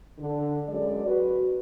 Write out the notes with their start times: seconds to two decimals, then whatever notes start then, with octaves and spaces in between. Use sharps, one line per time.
0.19 D3
0.67 F#2 G#3 D5
1.06 F#4 B4